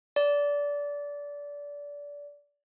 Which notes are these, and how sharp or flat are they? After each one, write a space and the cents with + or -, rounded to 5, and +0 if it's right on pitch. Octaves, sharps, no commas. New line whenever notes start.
D5 -25